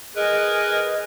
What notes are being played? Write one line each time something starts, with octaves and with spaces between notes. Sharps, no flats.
G#4 A#4 B4 D#5